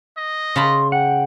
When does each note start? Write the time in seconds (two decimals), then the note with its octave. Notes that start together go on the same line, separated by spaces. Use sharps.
0.17 D#5
0.56 C#3 A5 B5 C6
0.92 F#5 G5